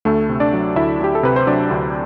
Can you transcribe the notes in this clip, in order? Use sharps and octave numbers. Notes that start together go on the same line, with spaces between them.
D2 A3 A4
C3
D4 D5
F#3
D2 E4 E5
D2 G4
A4
C3 B4
C5
F#3 D4 D5
D2